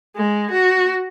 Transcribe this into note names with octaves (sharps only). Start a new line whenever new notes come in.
G#3
F#4